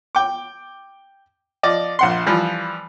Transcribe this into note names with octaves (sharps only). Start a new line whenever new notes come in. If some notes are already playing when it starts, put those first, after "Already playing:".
G5 D6
F3 D5 D#5
A#1 F#5 C6
E3 F3 G3